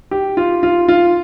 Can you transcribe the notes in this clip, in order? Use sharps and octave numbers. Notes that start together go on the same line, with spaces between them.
G4
F4
F4
F4